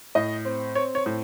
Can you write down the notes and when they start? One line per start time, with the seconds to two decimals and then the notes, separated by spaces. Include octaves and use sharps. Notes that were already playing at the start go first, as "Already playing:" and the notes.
0.15 A2 D#5
0.45 C4
0.75 C4 C#5
0.95 C#5
1.06 A2